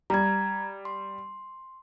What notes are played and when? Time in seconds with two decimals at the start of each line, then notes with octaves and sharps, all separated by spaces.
0.10 G3 A#5 G#6
0.85 C6